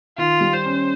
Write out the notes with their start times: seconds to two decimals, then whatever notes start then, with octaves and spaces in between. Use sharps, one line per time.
0.18 D#3 F4
0.41 G3
0.53 C5
0.66 C#4